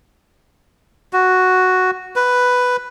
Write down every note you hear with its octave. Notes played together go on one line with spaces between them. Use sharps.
F#4
B4